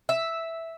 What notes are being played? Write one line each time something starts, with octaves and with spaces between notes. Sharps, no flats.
E5